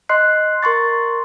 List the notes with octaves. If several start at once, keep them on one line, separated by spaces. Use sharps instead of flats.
D#5 C6 F#6 C7
A#4 C6 C#6 A6